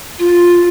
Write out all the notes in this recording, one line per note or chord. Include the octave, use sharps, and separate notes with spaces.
F4